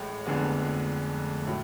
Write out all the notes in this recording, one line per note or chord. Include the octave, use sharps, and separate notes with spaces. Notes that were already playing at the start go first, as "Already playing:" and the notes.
Already playing: A1 A2 G#3
F1 F2 D3 G#3 B3
A2 F#3